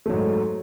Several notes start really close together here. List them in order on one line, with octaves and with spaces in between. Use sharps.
A3 F#3 G#2